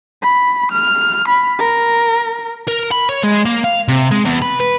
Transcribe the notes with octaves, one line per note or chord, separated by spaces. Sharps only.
B5
F6
B5
A#4
A#4
B5
C#5
G#3
A#3
F5
C3
G#3
E2
B4
B4